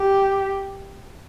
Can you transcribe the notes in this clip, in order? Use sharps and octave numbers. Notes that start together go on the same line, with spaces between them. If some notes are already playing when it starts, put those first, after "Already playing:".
Already playing: G4